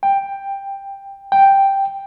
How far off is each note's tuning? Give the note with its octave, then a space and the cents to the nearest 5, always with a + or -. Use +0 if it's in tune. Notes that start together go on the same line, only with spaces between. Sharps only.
G5 +10
G5 +0